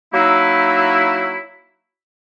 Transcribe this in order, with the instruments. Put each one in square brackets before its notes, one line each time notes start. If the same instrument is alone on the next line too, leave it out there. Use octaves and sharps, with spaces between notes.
[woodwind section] F#3 A#3 D#4 E4